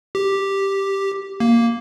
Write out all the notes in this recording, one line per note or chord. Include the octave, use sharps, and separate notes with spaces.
G4
A#3